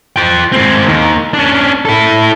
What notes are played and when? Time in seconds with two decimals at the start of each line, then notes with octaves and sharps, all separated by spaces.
0.16 F4 G5
0.52 G#3 C4
0.86 D#2 D#3
1.34 C#4 D4
1.85 E4 A4